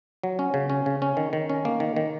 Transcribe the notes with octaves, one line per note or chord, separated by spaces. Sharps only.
F#3
C#4
C#3
C#4
C#3
C#4
D#3
D#3
C#4
A#3
D#3
D#3